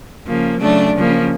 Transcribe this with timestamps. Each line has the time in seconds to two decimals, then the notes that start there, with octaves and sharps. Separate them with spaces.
0.26 C#3 F3 A#3
0.60 C#3 F#3 A3 D4
0.95 C#3 F3 A#3